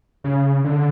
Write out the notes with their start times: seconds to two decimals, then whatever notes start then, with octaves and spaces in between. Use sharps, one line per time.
0.24 C#3
0.64 D3